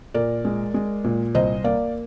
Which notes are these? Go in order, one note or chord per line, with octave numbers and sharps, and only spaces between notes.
A#2 A#4 D5
G#3
G#3
A#2
C2 C5 D#5
A#3 D5 F5